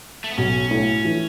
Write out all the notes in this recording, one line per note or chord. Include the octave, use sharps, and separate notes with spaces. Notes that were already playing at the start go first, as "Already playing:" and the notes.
A3
B3
B1 C#4
A2
E3